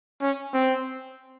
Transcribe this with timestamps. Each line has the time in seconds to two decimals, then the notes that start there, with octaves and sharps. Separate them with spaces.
0.21 C#4
0.53 C4